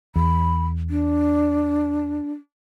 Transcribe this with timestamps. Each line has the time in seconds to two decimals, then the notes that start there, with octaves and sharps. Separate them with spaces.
0.16 E2 B5
0.90 D4